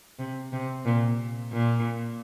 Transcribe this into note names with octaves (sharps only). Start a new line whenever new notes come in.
C3
C3
A#2
A#2